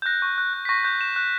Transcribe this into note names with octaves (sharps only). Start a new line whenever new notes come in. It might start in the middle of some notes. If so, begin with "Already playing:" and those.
G6
F#6 A#6
C#6
F#6
F#6
B6
C#6 A#6
F#6 G6
C#6 E7
F#6